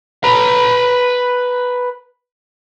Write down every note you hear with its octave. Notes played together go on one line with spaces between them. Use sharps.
B4 A#5